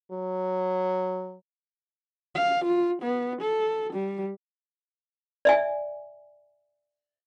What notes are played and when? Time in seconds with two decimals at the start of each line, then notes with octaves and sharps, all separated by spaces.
0.12 F#3
2.35 F5
2.65 F4
3.03 B3
3.42 A4
3.93 G3
5.45 D5 E5 G#5